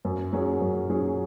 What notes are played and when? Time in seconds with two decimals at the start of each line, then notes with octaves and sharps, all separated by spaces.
0.05 F#2
0.33 F#3 C#4 G#4
0.61 F#2
0.90 F#3 C#4 G#4